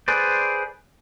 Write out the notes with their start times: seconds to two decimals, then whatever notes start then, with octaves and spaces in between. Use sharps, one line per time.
0.08 G#4 B4 C5 D5